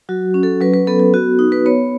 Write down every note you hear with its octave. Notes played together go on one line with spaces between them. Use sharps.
F#3 F#4
C#4
A4
F#3 B4
B4
B3 A4
A4
B3 F#4
D#4
B4
B3 C#5